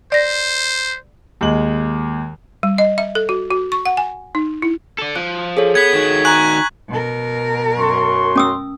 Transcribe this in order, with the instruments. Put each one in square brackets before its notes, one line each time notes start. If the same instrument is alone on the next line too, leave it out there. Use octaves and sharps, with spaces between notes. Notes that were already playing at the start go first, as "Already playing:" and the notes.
[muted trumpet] C5 [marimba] D5 A#6
[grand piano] D#2 G#3 F#7
[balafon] G3
D#5
E5
A4
F#4
F#4
C#6
F#5
G#5
D#4
E4
[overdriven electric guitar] A4 D5
[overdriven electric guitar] F3 [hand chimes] F#6
[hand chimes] G#4 A4 C#5
[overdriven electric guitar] B3 [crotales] G#6 B6
[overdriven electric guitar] D#3 F#4
[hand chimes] G#5 A#5 [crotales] C#6 F#6 F#7
[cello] B2 A#4
[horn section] F#2 C6 [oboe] C#6
[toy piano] C#4 D#6 E6